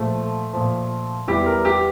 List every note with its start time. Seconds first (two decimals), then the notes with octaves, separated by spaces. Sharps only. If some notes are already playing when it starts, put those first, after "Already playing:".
Already playing: A#2 F3 A3
0.53 A#2 F3
1.28 E2 E3 G3 G4
1.46 A#4
1.65 G4